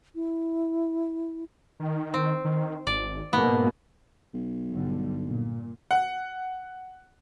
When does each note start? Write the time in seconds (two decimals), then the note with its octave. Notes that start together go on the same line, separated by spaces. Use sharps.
0.15 E4
1.80 D#3
2.14 C4
2.45 D#3
2.87 G#1 D5
3.33 G#2 B2 A#3 B3
4.34 B1
4.71 G1 D3 G3
5.27 A#2
5.91 F#5